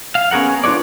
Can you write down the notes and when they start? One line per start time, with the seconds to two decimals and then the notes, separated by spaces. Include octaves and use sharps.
0.15 F5
0.31 B3 C#4 G#4 A#4 F#5
0.64 D4 F4 B4 C#5 D5